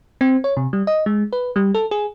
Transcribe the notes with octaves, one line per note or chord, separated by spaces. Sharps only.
C4
C#5
C3
G3
D#5
G#3
B4
G3
A4
G#4